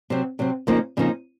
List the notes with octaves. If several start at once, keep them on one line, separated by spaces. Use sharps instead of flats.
C3 F#3 C4
C3 F#3 C4
F2 C#3 F3 A#3 D#4
F2 C#3 F3 A#3 D#4